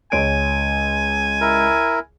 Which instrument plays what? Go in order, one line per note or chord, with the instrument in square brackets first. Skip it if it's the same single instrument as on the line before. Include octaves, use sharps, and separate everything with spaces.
[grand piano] C#2 C#5 D7 [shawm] G#5
[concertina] E4 A#4